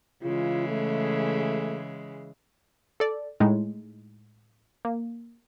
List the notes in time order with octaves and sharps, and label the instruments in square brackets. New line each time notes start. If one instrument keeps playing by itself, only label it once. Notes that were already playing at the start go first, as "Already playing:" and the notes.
[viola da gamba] C#3 E3 G#3 [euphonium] F4
[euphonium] A3
[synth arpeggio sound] A4 D5
A2 G#3 D#4
A#3